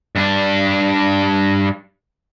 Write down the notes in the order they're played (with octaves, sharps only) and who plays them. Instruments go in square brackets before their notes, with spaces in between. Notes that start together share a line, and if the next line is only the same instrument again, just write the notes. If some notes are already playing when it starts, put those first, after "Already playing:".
[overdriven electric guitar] G2 D4